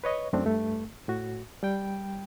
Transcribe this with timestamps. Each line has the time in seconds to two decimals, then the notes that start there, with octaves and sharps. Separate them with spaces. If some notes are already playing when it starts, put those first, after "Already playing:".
0.04 B4 C#5 D#5 C#6
0.33 F#2 A3 C4 D4
0.45 G2 A3
1.08 A2 F#4
1.63 G3 G5